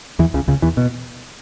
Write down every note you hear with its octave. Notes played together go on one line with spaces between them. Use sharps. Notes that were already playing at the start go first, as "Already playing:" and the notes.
E2 E3
C#2 C#3
C#2 C#3
E2 E3
B2